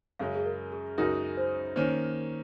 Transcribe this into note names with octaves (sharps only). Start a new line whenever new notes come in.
F#2 C#3 G#3 C#4 F5
G#4
A#4
G#4
F#2 C#3 G#3 D#4 F#4 A#4
C5
D#3 A#3 C#4 C5